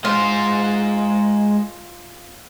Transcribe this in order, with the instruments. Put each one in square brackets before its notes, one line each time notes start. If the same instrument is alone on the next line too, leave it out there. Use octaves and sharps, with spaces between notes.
[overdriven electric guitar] G#3 C5 [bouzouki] F4